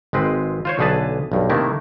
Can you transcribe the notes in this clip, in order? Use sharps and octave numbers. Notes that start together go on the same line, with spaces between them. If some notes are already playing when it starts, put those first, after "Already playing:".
G#1 G#3 C4 B4
F4 C5 C#5
B1 D3 G#4 B4 A5
B1 G2
C3 D#3 A3 A#3 E4